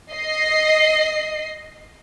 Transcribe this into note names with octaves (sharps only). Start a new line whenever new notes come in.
D#5 C7